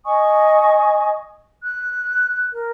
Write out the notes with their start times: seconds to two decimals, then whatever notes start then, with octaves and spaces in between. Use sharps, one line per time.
0.05 D#5 G#5 C#6 D#6
1.62 F#6
2.52 A#4